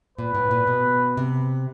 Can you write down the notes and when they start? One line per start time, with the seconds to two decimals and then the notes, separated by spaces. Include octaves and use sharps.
0.18 A#2 B4
0.35 A2
0.51 A#2
0.67 B2
1.17 C3